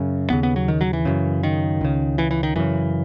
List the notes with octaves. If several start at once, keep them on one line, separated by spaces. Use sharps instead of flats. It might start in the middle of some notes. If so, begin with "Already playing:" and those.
Already playing: F#2 C#3
D#2 C#3 B3
B3
F#3
D#3
F#3
E3
F#2 C#3
D#3
C#2 C#3
E3
E3
D#3
F#2 C#3 E3